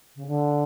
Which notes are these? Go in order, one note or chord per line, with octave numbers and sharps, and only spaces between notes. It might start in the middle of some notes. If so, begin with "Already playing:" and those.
C#3
D3